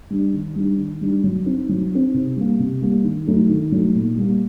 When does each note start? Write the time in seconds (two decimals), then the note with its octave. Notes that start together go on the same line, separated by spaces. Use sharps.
0.10 G3 D4
0.33 D#3
0.56 G3 D4
0.78 D#3
1.01 G3 D4
1.24 F#3
1.46 C4 D#4
1.69 F#3
1.91 C4 D#4
2.14 C3
2.36 G3 A#3
2.59 C3
2.82 G3 A#3
3.04 D#3
3.27 F#3 A3 D#4
3.49 D#3
3.72 F#3 A3 D#4
3.95 A#2
4.17 G3 A#3